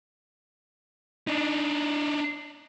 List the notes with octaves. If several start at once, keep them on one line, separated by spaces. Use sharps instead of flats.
D4 D#4